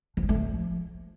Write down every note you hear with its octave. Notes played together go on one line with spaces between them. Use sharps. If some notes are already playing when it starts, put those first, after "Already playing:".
F3
G#3
A3
F3